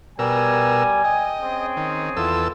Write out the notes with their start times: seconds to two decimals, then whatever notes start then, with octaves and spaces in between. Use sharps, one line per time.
0.19 B2 G3 A#4 G#5 E6
1.04 D#5 G5
1.41 C4 C#4 G#4
1.77 D#3
2.17 E2 F4 A4 E6